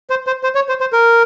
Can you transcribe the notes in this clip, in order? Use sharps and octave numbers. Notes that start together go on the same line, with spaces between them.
C5
C5
C5
C#5
C5
C5
A#4